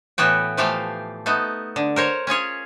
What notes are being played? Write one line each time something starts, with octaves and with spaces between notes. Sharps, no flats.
A2 E3 B3 F#4 G5
E3 F3 A3 G4 F5 G5
A3 B3 D#4
D3
A#4 C5 C#5
C#4 F4 G#4 C#5